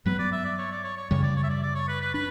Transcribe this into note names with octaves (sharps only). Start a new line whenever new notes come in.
G2 F#3 B3 B4
D5
E5
D5
C#5
D5
C#5
C#5
F#2 C#3 G3 C#5
D5
C#5
E5
D5
D5
C#5
B4
B4
D4 B4